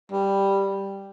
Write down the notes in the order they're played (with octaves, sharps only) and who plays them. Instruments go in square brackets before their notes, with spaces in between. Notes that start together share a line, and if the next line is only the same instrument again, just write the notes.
[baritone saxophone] G3